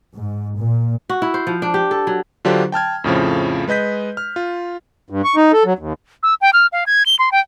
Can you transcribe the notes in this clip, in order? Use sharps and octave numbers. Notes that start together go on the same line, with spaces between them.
G#2
A#2
F#4
E4
C5
F3
D4
G4
A4
F#3
D3 F#3 D4 F4 G4 C5
G5 A5 F6 G#6
F2 A2 C#3 F3
G#3 B4 D#5 G6 B6
F6
F4
G2
C#6
D#4
A4
F#3
D#2
E6
G5
F6
F5
G#6
G7
C6
G5